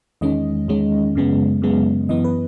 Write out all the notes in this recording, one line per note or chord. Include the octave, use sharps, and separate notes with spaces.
E2 D#3 G#3 C#4 D#5
E2 D#3 G#3 C#4
F#2 C#3 G#3 B3
F#2 C#3 G#3 B3
F#2 E3 B3 D#5
B4